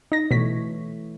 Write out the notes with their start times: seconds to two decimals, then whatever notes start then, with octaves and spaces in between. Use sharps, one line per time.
0.12 D#4 A#6
0.31 B2 E3 A3 C#5 B6